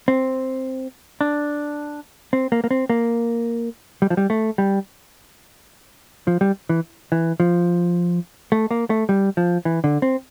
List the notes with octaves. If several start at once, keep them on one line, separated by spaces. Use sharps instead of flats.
C4
D4
C4
A#3
A#3
C4
A#3
G3
F3
G3
A3
G3
F3
G3
E3
E3
F3
A3
A#3
A3
G3
F3
E3
D3
C4